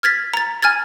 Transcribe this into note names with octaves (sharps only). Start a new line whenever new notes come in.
F6 G#6 A6 B6
A#5 A6
G#5 F6 G#6 A6